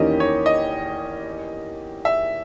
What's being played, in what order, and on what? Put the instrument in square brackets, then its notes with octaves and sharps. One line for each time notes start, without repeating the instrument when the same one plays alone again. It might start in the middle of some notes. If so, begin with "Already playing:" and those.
Already playing: [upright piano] E2 D#3 A#3 C#4 G4 [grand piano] D#5
[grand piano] C#5
D#5
E5